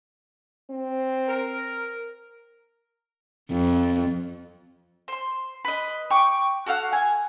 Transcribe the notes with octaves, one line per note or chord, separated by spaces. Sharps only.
C4
A#4
F2
C5 C6
B4 D#5
G5 C#6 D6
F#4 A4 F5 F#5
G#5